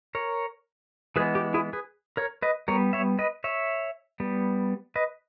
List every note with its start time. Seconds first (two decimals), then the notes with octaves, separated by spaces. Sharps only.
0.15 A#4 C#5
1.16 E3 G#3 B3 G#4 B4
1.35 G4
1.54 E4 G#4
1.73 G#4 B4
2.17 A#4 C#5
2.42 B4 D#5
2.68 G3 B3 A#4 C#5
2.93 C#5 E5
3.19 B4 D#5
3.44 C#5 E5
4.20 G3 B3
4.96 B4 D#5